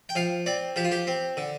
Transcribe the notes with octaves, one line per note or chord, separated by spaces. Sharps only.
G5
F3 F5
C4 D5
F3 G4
F4
G4
C4
D3